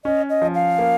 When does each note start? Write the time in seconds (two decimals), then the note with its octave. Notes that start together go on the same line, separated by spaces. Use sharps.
0.05 C#4 D#5
0.30 D#5
0.42 F3
0.55 F5
0.78 A#3